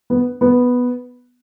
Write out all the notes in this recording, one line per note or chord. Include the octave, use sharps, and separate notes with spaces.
B3
B3